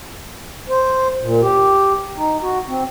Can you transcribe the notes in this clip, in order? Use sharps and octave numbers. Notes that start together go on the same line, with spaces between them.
C5
A#2
G4
D#4
F#4
C4